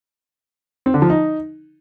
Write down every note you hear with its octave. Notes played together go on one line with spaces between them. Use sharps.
C4
D3
F3
D#4